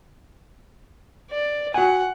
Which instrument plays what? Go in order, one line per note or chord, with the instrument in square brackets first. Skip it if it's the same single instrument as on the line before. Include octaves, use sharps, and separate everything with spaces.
[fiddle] D5
[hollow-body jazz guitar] F#4 G#5 [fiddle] F#5